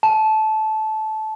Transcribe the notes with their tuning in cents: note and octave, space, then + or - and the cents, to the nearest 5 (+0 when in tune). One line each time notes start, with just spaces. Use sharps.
A5 -15